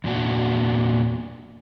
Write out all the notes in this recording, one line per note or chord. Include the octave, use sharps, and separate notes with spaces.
E2 A#2 D4 F#4